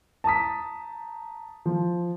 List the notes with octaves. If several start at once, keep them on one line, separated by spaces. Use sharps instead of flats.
A5 A#5 D#6 B6
F3